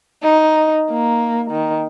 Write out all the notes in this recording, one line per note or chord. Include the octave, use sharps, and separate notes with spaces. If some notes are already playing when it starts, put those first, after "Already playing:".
D#4
A#3
D#3